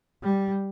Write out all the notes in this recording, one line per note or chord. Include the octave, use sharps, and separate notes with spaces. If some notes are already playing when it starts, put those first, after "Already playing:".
G3